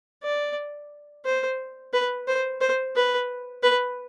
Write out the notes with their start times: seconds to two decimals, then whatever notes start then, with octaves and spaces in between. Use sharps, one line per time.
0.24 D5
1.25 C5
1.93 B4
2.28 C5
2.61 C5
2.96 B4
3.63 B4